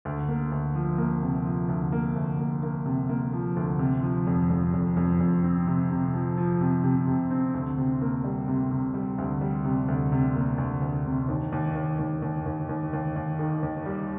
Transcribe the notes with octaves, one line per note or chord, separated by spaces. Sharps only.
D2
A#3
D2
F3
A#3
C3
F3
D2
A#3
D2
A#3
A#3
C3
A#3
F3
D2
C3
F3
F2
F2
F2
F2
F2
C4
C3
C3
F3
F3
C3
C3
C3
C4
D2
C3
A#3
G3
C3
C3
G3
D2
G3
C3
D2
C3
A#3
D2
D2
C3
D#2
D#2
D#2
D#2
D#2
D#2
D#2
D#2
D#2
D#3
D#2
G3